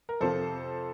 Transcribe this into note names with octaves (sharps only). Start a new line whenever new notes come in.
A#4
F2 C3 F3 A4 C5